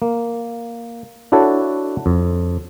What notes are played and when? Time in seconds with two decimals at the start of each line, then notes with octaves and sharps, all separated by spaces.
0.02 A#3
1.32 D4 E4 F#4 A4 C#5
2.06 F2